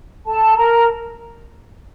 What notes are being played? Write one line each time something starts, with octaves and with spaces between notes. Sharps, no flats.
A4 A5
A#4 A#5